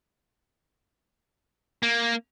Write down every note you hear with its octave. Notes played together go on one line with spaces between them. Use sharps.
A#3